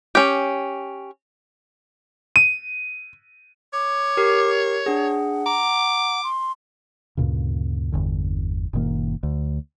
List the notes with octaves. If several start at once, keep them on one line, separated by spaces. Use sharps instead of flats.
C#4 G4
D#7
C#5 D6
G4 A#4 C7
D4 G#4 F#5
A#5 D6
C6
D2 G2 A#2 C#3
G1 E2 D3
F#1 A#2 D#3 A#3
D2